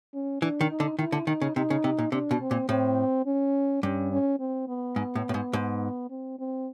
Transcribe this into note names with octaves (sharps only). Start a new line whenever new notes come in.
C#4
E3 D4
D#3
D#4
D3
D#3 E4
D3
D#3 D#4
C#3
C3 D#4
C#3
C3
A#2
C3 D4
B2
C4
A#2
A2 C4
C#4
G2 C#4
C#4
C4
B3
G#2
A2
A2
G#2
G#2
C4
C4